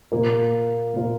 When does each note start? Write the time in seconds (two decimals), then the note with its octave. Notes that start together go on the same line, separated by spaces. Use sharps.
0.12 A#2 A#3 F4 A#4
0.94 A#2 A#3 F4 A#4